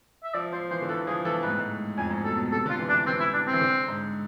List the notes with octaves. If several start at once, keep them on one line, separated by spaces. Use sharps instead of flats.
E5
F3 D5
F3 C5
E3 C5
D3
E3 A4
F3 G#4
E3 A4
G#2 B4
A2
G#2
F2 G#5
G#2
B2 A4
B2
C3 A4
D3 F4
E3
D4
E3
E3 C4
E4
D4
C4
E3
D3
G#2